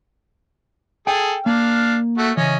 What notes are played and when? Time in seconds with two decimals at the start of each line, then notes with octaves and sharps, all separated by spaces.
1.07 G#4 A4 G5
1.46 A#3 D4 F5 F6
2.18 A3 F#4
2.37 C#3 E3 C#4 D#5